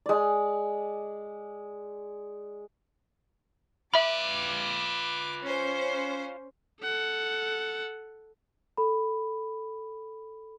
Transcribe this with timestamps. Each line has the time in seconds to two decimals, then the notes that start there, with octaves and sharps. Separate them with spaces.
0.06 G#3 D5
3.94 F4 B4 E5 B5 D6
5.43 C#4 C5
6.82 A4 F#5
8.77 A4 B5